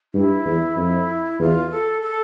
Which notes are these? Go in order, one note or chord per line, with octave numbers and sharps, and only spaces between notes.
G2 E4
E2
F2
E2 F4
A4
A4